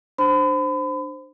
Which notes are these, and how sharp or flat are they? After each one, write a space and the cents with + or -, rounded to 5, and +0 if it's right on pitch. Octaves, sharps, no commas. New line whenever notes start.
D4 +25 C5 +0 B5 +35